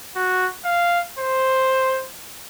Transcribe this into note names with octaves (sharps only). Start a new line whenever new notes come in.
F#4
F5
C5